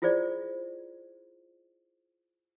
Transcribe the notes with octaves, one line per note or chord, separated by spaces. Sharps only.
E4 F4 G#4 C5 D5